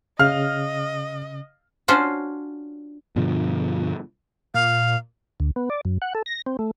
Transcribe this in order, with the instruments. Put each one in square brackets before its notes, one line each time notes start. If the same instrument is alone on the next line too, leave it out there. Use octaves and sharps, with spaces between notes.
[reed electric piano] C#3 [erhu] D#5 [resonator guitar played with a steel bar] F5 [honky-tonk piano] F6
[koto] C#4 D4 F4 F#4 C5
[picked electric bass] G2 B2 D3 F3
[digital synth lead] A#2 [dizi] F5
[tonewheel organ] D2
B3
D5
F#2
F#5
A4
A#6
C4
A3